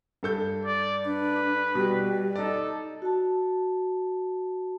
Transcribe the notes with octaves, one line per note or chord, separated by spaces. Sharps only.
G2 A4 G6
D5
D4 B4
B2 G3
D#4 A4 D5
F#4 A5